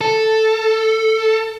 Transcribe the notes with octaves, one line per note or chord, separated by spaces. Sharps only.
A4